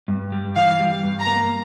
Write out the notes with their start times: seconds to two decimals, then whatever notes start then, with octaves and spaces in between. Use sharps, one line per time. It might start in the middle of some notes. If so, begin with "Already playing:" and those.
0.08 G2
0.32 G3
0.56 E3 F5
0.80 G3
1.03 G2
1.19 A#5
1.27 A#3